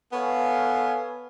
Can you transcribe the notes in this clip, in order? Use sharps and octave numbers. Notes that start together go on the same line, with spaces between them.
B3 A4 B4 C#5 F5 G#5